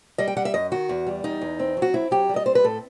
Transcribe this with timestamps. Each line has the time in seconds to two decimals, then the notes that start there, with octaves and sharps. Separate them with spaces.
0.18 G3 D#5
0.28 G5
0.37 G3 F#5
0.45 E5
0.54 F#2 D#5
0.72 D#3 F#4
0.89 E2
1.07 G3
1.24 E2 D#4
1.41 E2
1.59 C4
1.77 F#3
1.82 F#4
1.94 C4 E4
2.11 F#3 G4
2.29 G3
2.36 D#5
2.46 C4 C5
2.55 B4
2.64 A2 A4